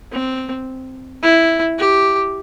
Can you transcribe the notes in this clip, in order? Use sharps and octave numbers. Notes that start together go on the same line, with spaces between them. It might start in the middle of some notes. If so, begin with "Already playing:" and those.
C4
E4
G4